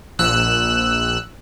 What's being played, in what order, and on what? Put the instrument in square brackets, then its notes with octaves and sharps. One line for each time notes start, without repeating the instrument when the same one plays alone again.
[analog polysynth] A#1 E6 F#6